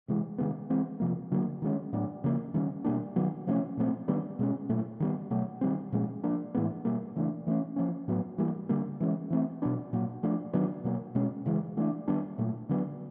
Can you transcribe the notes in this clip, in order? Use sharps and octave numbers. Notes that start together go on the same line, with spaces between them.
C3 E3 G#3
C3 D#3 G#3 B3
E3 G#3 C4
C3 F3 A#3
D3 F#3 A#3
D#3 G#3 C#4
A2 F#3 B3 D4
C#3 F3 A#3
D#3 G3 A#3 C#4
B2 G3 A#3 D4
D#3 F#3 B3
C3 F3 A3 C#4
A#2 F3 A3 C4
D#3 G3 B3 D4
B2 G#3 C#4
A#2 F#3 A3
D#3 G3 B3
B2 F#3 A3
D#3 G3 C4
A#2 F3 G#3 C#4
F3 A#3 D4
A2 E3 G#3 B3
B2 G3 A#3
C#3 E3 A3 D4
E3 A3 C#4
F3 A#3 C#4
A2 F#3 B3
E3 G3 A#3
D3 G3 A#3
E3 G#3 C#4
E3 A3 C4
B2 F#3 B3 D4
A#2 F#3 A#3
F3 A3 D4
D#3 F#3 B3 D4
B2 F#3 A#3
B2 G#3 C#4
C#3 E3 G#3
E3 A3 D4
D#3 G3 B3 D4
A#2 F#3 A3
D3 F#3 B3 D4